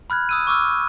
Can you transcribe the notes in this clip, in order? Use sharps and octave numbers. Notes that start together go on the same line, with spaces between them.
B5 F6 F#6 G#6
D#6 E6 D#7
C#6 D6 E6 F6